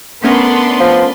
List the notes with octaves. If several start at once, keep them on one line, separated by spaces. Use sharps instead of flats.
A3 B3 C#4 D4 A#4 B4 C6
F3